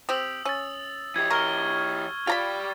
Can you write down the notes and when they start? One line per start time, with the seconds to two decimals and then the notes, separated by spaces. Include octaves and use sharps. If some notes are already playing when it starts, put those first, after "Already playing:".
0.09 C4 G4 D#6 E6 F#7
0.45 C#4 E6 A6
1.16 E3 G4 G#6
1.31 A#4 C#6 F6 G7
2.27 F4 G4 D5 A#5 B5 A6